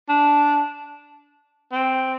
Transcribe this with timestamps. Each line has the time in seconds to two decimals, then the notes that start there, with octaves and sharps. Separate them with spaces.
0.09 D4
1.72 C4